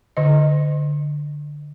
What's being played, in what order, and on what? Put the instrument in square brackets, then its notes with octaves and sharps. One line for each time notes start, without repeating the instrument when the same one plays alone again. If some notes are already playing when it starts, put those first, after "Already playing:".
[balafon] D3 D#5